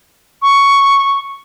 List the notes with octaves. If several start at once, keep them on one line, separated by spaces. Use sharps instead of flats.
C#6